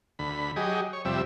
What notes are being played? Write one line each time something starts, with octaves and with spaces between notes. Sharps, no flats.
D2 B5
F#3 G4 G#4 D#5
C#5
F2 C3 G3 E5